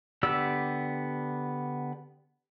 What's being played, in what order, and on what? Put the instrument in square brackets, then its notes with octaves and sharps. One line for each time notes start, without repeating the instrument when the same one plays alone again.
[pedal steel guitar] D3 B3 G4 D5 E6